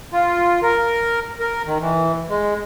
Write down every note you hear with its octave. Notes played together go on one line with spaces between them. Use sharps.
F4
A#4
A#4
D#3
E3
G#3